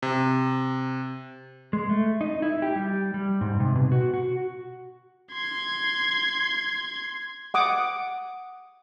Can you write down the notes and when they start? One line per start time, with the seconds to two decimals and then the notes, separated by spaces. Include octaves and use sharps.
0.03 C3
1.73 G#3
1.89 A3
2.21 D#4
2.42 E4
2.62 G4
2.76 G3
3.14 G3
3.41 G#2
3.60 C3
3.75 B2
3.92 F#4
4.14 F#4
5.33 C6 G#6
7.54 F#5 D6 D#6